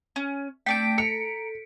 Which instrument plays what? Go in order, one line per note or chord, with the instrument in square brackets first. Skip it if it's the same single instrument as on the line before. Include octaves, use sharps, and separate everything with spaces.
[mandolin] C#4
[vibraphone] A3 [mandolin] C4 D4 G5 [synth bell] B6 D7
[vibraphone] A4 [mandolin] A#5 [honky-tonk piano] C#7